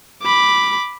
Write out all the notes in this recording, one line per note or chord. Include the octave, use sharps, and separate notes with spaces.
B5 D6